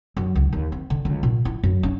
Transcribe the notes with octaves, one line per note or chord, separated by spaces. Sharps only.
F#2
C#2
D#2
C4
D3
C#2
A#2
E4
F#2
C#4